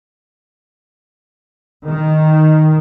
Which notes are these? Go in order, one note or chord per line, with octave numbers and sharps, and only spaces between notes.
D#3